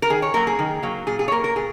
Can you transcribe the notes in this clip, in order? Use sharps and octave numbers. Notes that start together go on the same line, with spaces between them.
A#4
D#3 G#4
C#5
F#3 A#3 A#4
G#4
D#3
F#3 A#3
A#2 G#4
G#4
C#5
A#3 A#4
A#4
A#2 G#4